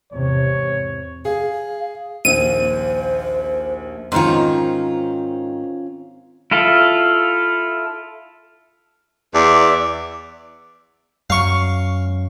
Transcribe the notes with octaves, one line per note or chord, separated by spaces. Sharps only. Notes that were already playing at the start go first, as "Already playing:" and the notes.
E2 G#2 C3 C#5
G#4 F5
A#1 D#2 C5 D#7
G#2 D#3 C4 C#4 F4
E4 F4 A4
E2 D5 E5
F#2 F5 C#6